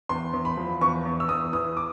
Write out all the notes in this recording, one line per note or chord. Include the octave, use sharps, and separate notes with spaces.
E2 C6
E2
B5
F3
E2 C#6
E2
E6
E2 D#6
E3 D#6
D6